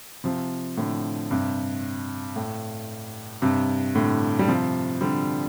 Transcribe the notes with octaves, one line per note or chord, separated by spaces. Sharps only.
C3 F3
A2 D3
G2 C3
A2
G2 C3
A2 D3
G3
C3 F3
D3 G3